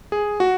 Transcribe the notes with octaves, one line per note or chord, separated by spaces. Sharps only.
G#4
F#4